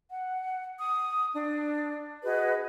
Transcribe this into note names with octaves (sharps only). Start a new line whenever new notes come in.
F#5
D#6
D4
F#4 G#4 B4 D#5